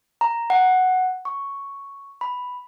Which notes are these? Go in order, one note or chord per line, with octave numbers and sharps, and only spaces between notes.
A#5
F#5
C#6
B5